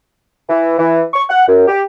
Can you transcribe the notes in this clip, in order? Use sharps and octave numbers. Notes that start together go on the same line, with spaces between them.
E3
E3
C#6
F#5
F#2
G4